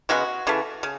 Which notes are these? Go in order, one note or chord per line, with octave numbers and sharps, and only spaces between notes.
C#3 G#3 B3 F#4
C#3 E3 A3
C#3